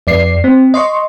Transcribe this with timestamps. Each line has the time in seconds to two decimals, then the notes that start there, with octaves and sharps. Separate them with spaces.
0.07 F2 D5 C7
0.44 C4
0.74 D#5 C6 C#6